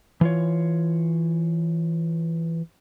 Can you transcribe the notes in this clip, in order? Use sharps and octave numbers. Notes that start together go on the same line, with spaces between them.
E3 F4 C#5